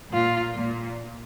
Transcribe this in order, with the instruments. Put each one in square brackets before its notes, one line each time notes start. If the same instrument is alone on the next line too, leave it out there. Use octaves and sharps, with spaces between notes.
[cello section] A#2 [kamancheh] F4
[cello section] A#2